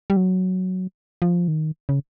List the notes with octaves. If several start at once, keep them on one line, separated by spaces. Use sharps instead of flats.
G3
F#3
F3
D#3
C#3